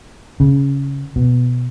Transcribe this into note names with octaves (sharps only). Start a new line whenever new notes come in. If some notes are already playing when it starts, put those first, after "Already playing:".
C#3
B2